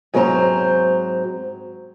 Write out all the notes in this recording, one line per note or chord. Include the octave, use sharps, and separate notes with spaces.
G#2 F#3 C4 A#4 C5 A#5